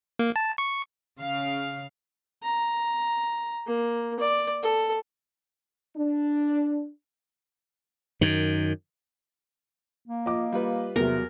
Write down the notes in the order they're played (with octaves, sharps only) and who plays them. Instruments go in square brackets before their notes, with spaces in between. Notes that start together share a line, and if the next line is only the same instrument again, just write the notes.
[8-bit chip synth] A#3
A5
C#6
[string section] C#3 F5
[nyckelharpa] A#5
A#3
D5
A4
[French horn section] D4
[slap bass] F#2 D#3
[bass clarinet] A#3
[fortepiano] F3 [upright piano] D#5 D6
[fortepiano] G3 F4 B4
[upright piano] E2 F#3 [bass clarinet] C3 [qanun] A#4